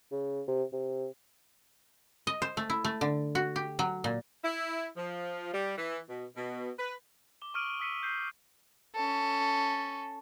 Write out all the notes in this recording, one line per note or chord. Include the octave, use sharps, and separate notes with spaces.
C#3
C3
C3
D#5
C5
A3
E4
A3
D3
F#4
G4
F#3
A#2
E4
F3
G3
E3
B2
B2
B4
D6 G7
C#6 D#6 F6 D7 D#7 F#7
D#6 E6 B6 C#7 D#7
C#6 G6 C7 D#7
C#4 A4